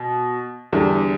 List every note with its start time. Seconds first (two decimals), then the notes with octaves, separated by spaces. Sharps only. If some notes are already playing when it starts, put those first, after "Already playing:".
Already playing: B2
0.72 E2 D3 G3